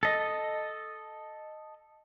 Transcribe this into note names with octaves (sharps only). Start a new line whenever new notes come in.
A4 D#5